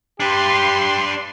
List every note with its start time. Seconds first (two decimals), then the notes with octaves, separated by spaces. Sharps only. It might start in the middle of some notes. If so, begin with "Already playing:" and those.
0.20 D4 G4 B4 C6